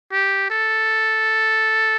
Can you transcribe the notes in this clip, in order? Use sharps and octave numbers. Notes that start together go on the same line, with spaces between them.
G4
A4